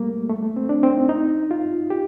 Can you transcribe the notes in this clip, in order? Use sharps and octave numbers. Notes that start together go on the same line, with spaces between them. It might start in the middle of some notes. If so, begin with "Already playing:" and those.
Already playing: G3 A3 A#3
A3
A3
C4
D4
C4
D#4
D#4
F4
G4